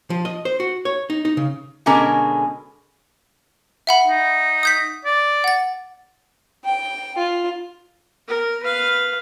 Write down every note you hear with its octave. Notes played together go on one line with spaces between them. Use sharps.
F3
D#5
C5
F#4
C#5
D#4
D#4
C#3
B2 D3 G#3 C#4 A#4
E5 F#5 B5
D#4
D#6 G6 B6
D5
F#5 A6
G5
F4
A#4
B4 F5